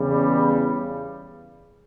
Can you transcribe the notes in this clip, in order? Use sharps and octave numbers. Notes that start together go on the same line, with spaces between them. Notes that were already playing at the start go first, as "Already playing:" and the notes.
Already playing: E2 C#3 G3